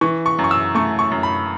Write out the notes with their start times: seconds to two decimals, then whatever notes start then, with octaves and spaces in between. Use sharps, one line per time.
0.01 E3 C#6
0.26 C#6
0.39 F#2
0.44 C#6
0.51 E6
0.75 A3 C#6
0.99 C#6
1.12 F#2
1.23 B5